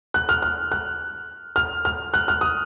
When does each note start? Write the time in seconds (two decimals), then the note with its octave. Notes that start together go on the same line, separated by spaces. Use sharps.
0.14 F#6
0.29 F6
0.42 F6
0.72 F#6
1.56 F6
1.85 F6
2.14 F#6
2.28 F6
2.41 D#6